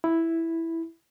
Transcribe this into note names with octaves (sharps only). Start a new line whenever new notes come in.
E4